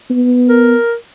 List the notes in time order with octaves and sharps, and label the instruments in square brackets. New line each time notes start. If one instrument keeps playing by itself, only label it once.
[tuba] B3
[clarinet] A#4